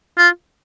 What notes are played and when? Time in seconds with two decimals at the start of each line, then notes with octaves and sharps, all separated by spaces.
0.18 F4